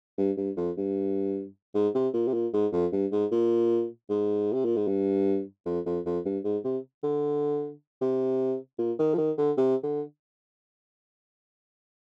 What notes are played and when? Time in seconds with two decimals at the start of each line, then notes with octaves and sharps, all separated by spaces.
0.18 G2
0.37 G2
0.57 F2
0.77 G2
1.74 G#2
1.95 C3
2.14 A#2
2.28 C3
2.34 A#2
2.53 G#2
2.73 F2
2.92 G2
3.12 G#2
3.32 A#2
4.10 G#2
4.53 C3
4.65 A#2
4.76 G#2
4.88 G2
5.66 F2
5.86 F2
6.06 F2
6.25 G2
6.44 G#2
6.64 C3
7.03 D3
8.02 C3
8.79 A#2
8.99 D#3
9.14 F3
9.18 D#3
9.38 D3
9.57 C3
9.83 D3